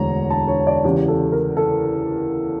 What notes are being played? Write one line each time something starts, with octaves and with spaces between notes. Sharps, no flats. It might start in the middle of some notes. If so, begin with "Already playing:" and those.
Already playing: E1 D2 D3 C#5 A#5
A5
C#5
D5
E2 C#3 E3 G4
A4
A#4
A4